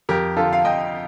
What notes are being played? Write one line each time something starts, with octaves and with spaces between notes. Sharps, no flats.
F2 G4 A#4
D3 F3 F4 A4
F5
F2 D#5 G5